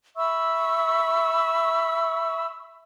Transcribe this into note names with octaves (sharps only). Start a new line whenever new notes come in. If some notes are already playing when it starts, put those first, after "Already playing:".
E5 B5 C#6 E6